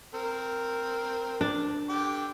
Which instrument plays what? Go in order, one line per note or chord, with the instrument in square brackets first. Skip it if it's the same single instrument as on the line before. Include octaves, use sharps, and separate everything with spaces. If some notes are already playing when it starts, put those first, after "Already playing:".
[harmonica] C4 A#4
[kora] D4
[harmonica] D3 G5 D6